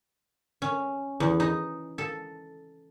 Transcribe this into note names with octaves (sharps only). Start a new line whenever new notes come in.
C#4
E2
D#4
A4